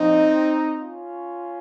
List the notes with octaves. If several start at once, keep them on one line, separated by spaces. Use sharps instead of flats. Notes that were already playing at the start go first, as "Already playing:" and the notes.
Already playing: A#2 F3 C4 D#4
C#4 F4